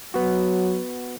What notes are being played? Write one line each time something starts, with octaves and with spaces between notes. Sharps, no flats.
F#3 B3 F#4